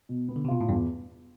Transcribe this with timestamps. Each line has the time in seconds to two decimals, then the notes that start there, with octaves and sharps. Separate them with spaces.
0.09 B2
0.28 B3
0.36 D3
0.45 C3
0.48 B2 F4
0.61 A2
0.69 E2 G2